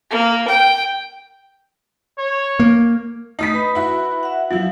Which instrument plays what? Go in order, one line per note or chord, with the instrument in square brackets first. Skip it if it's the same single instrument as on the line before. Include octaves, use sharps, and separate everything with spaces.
[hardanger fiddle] A#3
G5
[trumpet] C#5
[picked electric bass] A#3
[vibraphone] A3 [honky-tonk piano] D#4 D#6 B6
[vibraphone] B4 B5
[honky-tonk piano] E4 F#4
[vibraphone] E5 F#5
[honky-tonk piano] F3 E4 [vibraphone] F#3 F5